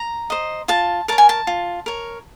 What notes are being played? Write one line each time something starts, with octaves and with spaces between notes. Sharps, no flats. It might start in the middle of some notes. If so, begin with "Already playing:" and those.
Already playing: A#5
C5 D#5
F4 A5
A#4 C#5 A5
G#5
A5
F4
A#4 C#5